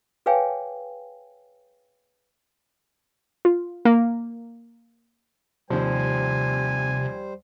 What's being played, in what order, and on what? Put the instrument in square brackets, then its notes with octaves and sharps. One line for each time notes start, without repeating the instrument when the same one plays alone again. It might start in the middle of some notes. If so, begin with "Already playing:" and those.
[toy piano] G#4 B4 C#5 F5 G5 G#5
[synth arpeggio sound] F4
A#3
[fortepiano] D#2 F3 [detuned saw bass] C3 [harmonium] G3 C5 [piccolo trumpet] G#5